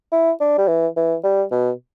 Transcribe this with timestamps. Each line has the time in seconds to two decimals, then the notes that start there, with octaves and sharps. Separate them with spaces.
0.12 E4
0.40 D4
0.58 G3
0.68 E3
0.96 E3
1.24 G3
1.51 B2